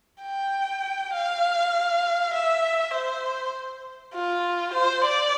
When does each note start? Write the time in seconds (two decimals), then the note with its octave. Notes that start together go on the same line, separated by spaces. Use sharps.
0.23 G5
1.13 F5
2.33 E5
2.94 C5
4.15 F4
4.74 C5
5.05 D5